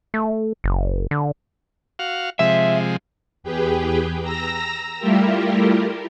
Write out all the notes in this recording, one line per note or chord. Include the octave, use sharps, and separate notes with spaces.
A3
F#1
D3
F#4 F5
C3 F3 G#3 E5
E2 G4 G#4 B4 G5
A#5 E6 A#6
G3 A3 E4 F4 G4 A#4